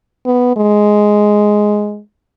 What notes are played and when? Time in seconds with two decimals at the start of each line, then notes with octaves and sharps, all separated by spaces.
0.26 B3
0.57 G#3